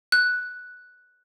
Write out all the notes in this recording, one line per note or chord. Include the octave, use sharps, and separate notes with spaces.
F#6